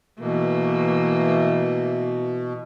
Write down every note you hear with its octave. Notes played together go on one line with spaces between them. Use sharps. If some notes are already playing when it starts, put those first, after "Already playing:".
B2 E3 A3 A#3